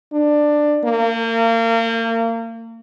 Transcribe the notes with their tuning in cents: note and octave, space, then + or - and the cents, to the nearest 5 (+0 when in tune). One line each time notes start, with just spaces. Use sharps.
D4 +15
A#3 -35